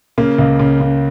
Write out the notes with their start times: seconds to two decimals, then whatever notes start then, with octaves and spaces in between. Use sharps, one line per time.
0.18 C#3 A#3
0.38 C#2
0.60 C#3
0.81 C#3